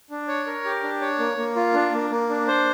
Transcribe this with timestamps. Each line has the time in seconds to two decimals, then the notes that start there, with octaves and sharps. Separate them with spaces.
0.10 D4
0.28 C#5
0.47 A#4
0.65 G4
0.83 D4
1.01 C#5
1.19 A#3
1.38 A#3
1.56 F4
1.74 D4
1.93 A#3
2.10 A#3
2.29 D4
2.48 C5